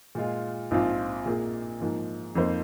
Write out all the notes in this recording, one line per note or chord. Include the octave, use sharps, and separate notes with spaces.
A#2 G#3 F4
A#1 G#2 F3 C4 F4
A#2 A#3 G#4
G#2 F3 A#3
F2 F3 A#3 D#4 C5